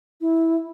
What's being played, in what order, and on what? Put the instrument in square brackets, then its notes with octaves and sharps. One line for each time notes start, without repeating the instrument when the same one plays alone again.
[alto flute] E4